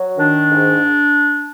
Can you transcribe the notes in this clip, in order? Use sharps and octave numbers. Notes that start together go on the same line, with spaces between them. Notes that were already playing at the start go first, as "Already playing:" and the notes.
Already playing: F#3
D#3 D4
G#2